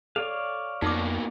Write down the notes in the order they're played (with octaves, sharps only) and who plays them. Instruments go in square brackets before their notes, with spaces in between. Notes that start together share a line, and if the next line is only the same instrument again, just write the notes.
[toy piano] A4 [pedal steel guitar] C#5 D5 F5
[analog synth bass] F2 [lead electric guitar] B2 A#3 [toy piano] D#4 D6